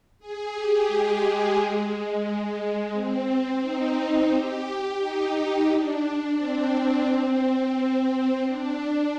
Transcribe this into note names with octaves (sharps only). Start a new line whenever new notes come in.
G#4
G4
G#3
G#3
C4
D#4
G4
D#4
D4
C4
C4
D4